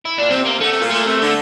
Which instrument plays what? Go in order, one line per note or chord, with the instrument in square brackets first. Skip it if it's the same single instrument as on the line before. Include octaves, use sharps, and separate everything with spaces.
[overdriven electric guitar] E4
[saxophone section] A#2 [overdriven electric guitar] D4
[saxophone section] C3 [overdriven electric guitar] C4
[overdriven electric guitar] A#3
[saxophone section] D3 [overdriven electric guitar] A3
[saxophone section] C3
A#2
[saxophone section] A#2 [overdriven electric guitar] A3
[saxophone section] C3
D3